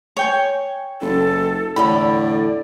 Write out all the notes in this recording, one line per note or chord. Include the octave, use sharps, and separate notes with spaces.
C#5 G5 G#5
F#1 A4
E2 A2 D3 A4 D5 B5